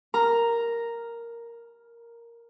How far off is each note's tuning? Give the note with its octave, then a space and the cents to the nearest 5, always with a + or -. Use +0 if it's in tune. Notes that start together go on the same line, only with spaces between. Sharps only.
A#4 +0 A#5 +0